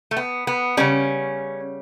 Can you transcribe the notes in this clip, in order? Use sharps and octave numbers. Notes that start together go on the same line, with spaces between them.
A3
B3
B3
C#3 G3 C#4